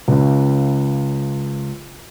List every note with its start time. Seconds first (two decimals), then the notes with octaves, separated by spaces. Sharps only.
0.08 C#2 C#3